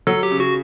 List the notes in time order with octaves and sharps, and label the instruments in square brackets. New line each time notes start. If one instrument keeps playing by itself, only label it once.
[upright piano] F#3 [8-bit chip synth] A4
[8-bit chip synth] G4
[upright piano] C#3
[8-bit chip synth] F#4